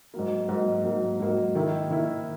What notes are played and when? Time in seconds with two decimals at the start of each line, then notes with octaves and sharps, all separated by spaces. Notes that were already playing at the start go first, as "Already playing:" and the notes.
0.14 G#2 F#3 A#3
0.49 G#2 F#3 A#3
0.84 G#2 F#3 A#3
1.20 G#2 F#3 A#3
1.55 D#3 A#3 E4
1.90 D#3 A#3 E4